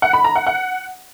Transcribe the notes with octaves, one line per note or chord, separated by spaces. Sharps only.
F#5
B5
A#5
F#5
F#5